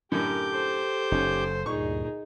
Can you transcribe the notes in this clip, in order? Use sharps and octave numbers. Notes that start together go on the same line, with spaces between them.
F#2 A2 D3 G4 A#4 D6 G6
A4 C5
F#1 C#4 D#4
D2 G2 A#2 D#4 G#4 C#6